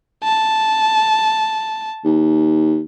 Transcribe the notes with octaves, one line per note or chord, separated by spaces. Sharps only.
A5
D#2